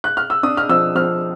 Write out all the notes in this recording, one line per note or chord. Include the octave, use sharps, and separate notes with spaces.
F#6
F6
E6
D4 D#6
F6
F3 E6
F3 F6